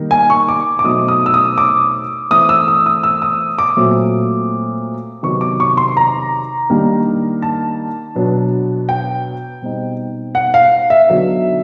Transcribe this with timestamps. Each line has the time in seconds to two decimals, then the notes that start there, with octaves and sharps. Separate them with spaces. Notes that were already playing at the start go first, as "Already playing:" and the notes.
Already playing: D#3 G3 A#3
0.11 G#5
0.30 C#6
0.49 D6
0.79 D6
0.84 B2 F#3 A3 C4 D#4 D#6
1.08 D#6
1.26 E6
1.34 D#6
1.58 D6
2.31 E3 A3 C4 D#6
2.49 E6
2.68 D#6
2.86 D#6
3.03 E6
3.22 D#6
3.58 D6
3.77 A#2 F#3 A3 C4
5.23 C3 D#3 F#3 B3 C#6
5.41 D6
5.60 C#6
5.77 C6
5.97 A#5
6.70 D#3 G3 A#3 D4
7.42 A5
8.15 B2 F#3 B3 D4
8.89 G5
9.62 B2 G3 C4 D#4
10.35 F#5
10.54 F5
10.90 E5
11.08 D3 F#3 B3 D#4